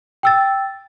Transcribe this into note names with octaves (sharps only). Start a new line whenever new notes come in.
G5 E6 A6